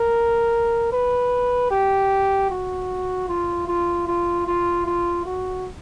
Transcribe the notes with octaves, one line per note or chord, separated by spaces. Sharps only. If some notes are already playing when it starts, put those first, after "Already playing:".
Already playing: A#4
B4
G4
F#4
F4
F4
F4
F4
F4
F#4